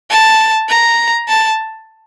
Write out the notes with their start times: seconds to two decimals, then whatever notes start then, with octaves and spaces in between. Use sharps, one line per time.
0.10 A5
0.69 A#5
1.28 A5